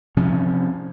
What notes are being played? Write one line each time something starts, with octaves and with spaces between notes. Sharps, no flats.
C3 F3 C#4